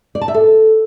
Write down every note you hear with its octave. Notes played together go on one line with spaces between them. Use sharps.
D5
A5
E5
A4